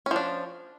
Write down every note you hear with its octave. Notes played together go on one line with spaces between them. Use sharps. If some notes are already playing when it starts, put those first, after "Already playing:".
F3 C#4 D4